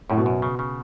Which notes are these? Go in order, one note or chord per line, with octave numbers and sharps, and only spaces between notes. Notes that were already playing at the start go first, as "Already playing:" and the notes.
F#2 A2
B2
F#2
C#3
C#3